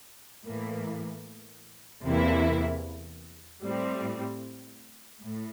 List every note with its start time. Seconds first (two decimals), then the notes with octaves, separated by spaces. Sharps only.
0.45 A2 E3 A#3
2.04 E2 C3 E3 A#3 E4
3.63 A2 G3 C4
5.22 A2